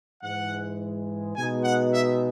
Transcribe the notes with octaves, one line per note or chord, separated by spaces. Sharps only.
G#2 E3 G#3 F#5
B2 G#3 D#4 G#5
F#5
E5